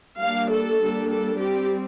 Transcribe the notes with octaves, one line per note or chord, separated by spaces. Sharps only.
G3 A#3 D4 F5
A4
G3 A#3 D4
A4
G3 C4 G4